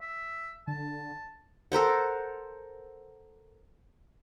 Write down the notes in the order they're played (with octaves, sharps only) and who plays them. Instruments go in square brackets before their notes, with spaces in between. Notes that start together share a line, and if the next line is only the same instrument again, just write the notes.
[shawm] E5
[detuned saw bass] D3 [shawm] A5
[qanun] A4 A#4 C5 F#5